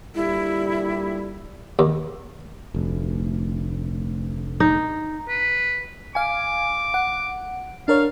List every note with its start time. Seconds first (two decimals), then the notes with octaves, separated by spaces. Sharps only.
0.15 A#2 D3 G3 E4
1.79 D#2
2.74 F1 D2
4.60 D#4
5.29 B4
6.15 F5 G#5 D6
6.94 F#5
7.88 D4 A#4 C#5 F5